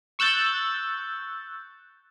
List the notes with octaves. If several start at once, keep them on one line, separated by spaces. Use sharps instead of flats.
C#6 E6 F#6 G6 A6